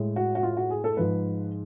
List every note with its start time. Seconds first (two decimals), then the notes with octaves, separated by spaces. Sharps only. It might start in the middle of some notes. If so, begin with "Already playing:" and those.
Already playing: A2 G#3
0.16 F#4
0.35 F#4
0.43 F4
0.57 F#4
0.70 G#4
0.84 A4
0.97 G#2 F3 G#3 B4